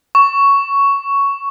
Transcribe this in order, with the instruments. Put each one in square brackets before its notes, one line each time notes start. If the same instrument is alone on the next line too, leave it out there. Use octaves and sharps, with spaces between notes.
[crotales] C#6